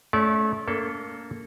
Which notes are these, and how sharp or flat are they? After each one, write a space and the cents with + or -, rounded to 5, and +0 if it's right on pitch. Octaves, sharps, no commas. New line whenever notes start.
A3 -25 C#4 +0 D5 -25
A#3 +0 D4 -45 A4 +0